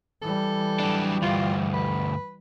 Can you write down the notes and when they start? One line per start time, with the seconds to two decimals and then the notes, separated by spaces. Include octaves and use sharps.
0.22 E3 G3 A4
0.80 F#3 D4
1.22 D2 G2 F4
1.73 B4